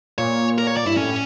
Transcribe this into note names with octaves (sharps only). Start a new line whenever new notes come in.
A#2 C#5
A#4
C#5
D5
G2 E4
A2 C#4